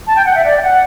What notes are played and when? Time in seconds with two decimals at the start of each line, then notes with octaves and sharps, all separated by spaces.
0.07 A5
0.15 G5
0.25 F#5
0.34 E5
0.44 D5
0.57 G5
0.62 F#5